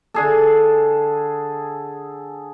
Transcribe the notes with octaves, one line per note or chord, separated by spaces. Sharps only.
D3 G#4 A4